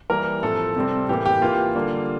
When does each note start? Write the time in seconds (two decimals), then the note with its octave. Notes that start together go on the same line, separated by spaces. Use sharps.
0.10 E3 G3 A#3 A#4
0.43 A2 F3 A3 C4 A4
0.76 C3 G3 C4
1.09 A2 E3 A#3 G4
1.26 G4
1.42 E3 A#3 F4
1.75 D3 G3 A#3